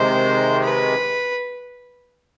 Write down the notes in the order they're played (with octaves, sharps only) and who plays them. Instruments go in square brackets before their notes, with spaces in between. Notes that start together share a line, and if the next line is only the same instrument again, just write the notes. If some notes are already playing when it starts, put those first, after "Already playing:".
Already playing: [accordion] C3 D#3 G#3 [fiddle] C5
[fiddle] B4